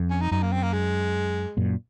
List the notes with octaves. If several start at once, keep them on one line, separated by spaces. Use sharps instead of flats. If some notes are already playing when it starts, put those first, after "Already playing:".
Already playing: F2
C#4
D#4
F#2 D#4
A#3
C4
A#3
G#3
F#2 A#2